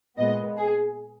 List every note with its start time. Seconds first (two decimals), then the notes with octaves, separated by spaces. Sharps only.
0.17 A#2 G#3 B3 D#5
0.57 G#4